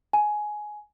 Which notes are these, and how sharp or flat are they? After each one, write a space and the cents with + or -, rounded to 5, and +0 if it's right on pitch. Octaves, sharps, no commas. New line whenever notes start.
G#5 +15